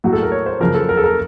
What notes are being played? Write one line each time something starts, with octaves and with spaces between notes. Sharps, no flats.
A2 F#3 F#4
A4
A#4
C#5
C5
F#2 C#3 F3 A#4
A4
A#4
A4
A#4